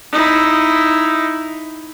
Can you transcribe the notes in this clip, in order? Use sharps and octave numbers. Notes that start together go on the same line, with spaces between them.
D#4 E4